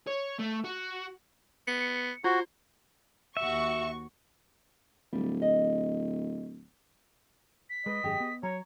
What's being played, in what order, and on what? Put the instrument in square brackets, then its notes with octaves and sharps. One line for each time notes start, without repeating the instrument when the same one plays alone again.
[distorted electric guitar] C#5
A3
F#4
[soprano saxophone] B3 [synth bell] C#7
[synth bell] F4 [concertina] F#4 [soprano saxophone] C5
[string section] D#2 F#4 C#6 [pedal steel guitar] E5
[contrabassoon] D1 [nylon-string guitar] G3
[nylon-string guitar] D#5
[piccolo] B6
[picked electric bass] G#3 [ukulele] B4 [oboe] D#5
[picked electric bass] G#1 F#2 [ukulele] G4 G#4
[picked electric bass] B3
[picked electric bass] F#3 [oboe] C#5 [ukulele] A#5